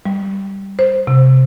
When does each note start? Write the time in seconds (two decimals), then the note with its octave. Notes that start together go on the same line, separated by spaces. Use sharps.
0.06 G3
0.79 C5
1.07 C3